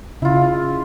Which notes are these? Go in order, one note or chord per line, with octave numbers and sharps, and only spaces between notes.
C#3 E4 F4